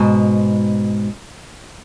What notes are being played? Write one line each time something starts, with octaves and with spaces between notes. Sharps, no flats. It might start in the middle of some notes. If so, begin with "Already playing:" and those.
Already playing: G#2 B2